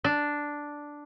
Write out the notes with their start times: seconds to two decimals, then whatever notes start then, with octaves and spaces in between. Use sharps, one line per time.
0.04 D4